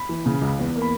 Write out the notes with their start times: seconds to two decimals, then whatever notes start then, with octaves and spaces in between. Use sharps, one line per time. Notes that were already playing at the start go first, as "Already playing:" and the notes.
Already playing: B5
0.09 E3
0.26 C#3
0.42 C#2
0.59 E2
0.76 A#3
0.82 B5